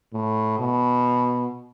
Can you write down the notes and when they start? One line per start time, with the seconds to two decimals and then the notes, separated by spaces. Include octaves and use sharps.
0.13 A2
0.59 B2